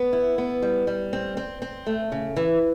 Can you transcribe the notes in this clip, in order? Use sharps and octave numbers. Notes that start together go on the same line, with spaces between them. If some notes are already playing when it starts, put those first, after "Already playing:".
Already playing: B3
E4
B3
G3
G3
C4
C4
C4
A3
C#3
E3